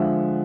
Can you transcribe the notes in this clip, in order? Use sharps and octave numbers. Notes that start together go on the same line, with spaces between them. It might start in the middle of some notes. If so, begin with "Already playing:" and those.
Already playing: D3 F3 G#3 E5 F#5